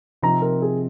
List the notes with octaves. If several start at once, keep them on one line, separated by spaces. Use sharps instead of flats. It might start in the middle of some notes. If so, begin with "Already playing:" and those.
C3 F3 C4 D#4 A#5
A#4
G#4